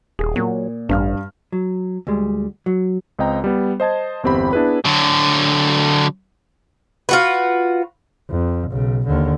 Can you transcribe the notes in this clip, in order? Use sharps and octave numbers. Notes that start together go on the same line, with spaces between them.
D#1 G#4
A#2 F#3
A1 G2 F5 F6
F#3
D2 G3 G#3
F#3
C#2 C4 D#5 G5 A#5
G3 B3
C5 D#5 A5 G#6
G1 E2 C4 G4 B5
B3 D4 E4 G#4 B4
D3 F#3
F4 F#4 B4
F2
B1 C#3
D#2 D3